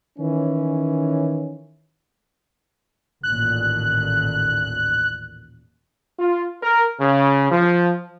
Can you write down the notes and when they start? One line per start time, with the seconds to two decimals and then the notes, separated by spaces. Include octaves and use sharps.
0.18 D#3 E3 C#4
3.23 A1 D#2 A#2 F#6
6.20 F4
6.63 A#4
7.00 C#3
7.51 F3